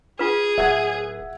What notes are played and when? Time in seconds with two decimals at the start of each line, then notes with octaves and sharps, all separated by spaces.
0.19 F4 G#4 B4
0.58 D1 E5 F#5 G#6